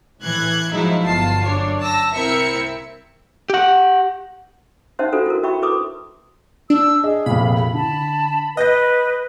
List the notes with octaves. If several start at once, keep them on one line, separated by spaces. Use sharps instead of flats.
A2 E3 F#6 G#6
F3 F#3 G#3 D#4 E4
G1 B2 F4 A5 C7
F#2 D4 C#5
A5 E6 A#6
C2 C4 E4 A#4 E5 C#7
G4 F#5
C#4 D#4 C5 E5 F#5 C6
D4 F4 F#4 A4 C5
E4 F#4 A#4
F#4 E5 G5 B5 C#6
E4 A4 B4 C6 D6 D#6
D4 E6
G#4 D#5
F1 A#2 B5
D3 A5
B4 D#5 F#6 G6 A#6